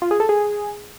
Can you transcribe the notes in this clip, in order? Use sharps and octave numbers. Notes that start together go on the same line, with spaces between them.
F4
G#4
A4
G#4